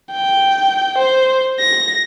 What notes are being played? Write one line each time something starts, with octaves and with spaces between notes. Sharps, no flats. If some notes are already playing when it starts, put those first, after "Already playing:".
G5
C5
A#6